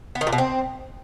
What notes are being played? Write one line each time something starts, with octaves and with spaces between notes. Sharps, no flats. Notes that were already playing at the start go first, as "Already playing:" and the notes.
B3
D#3
A#2
B2
C4